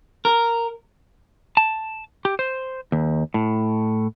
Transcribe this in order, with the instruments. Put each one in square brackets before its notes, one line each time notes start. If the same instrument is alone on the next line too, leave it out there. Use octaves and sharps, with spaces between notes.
[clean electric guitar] A#4
A5
G4
C5
D#2
A2